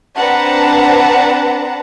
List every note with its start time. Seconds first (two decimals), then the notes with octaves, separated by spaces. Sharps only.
0.18 C4 D4 B4 F#5 A5 A#5